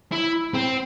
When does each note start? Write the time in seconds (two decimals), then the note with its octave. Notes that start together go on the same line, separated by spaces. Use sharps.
0.12 E4
0.55 C4